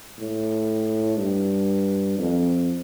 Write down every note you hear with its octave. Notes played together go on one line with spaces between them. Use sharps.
A2
G2
F2